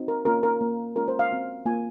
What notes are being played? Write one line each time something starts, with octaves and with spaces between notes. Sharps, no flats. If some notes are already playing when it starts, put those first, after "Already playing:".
Already playing: C4 D#4 F#4
A#4
A#3 C#4 F4 A#4
A#4
A#3 F4
G#3 C#4 F4 A#4
C5
F5
C4 F#4
A#3 F4 G#5